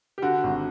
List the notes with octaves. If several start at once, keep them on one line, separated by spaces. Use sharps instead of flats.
G4
D3 F#4
G#1